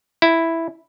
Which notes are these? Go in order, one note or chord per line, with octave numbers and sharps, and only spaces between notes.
E4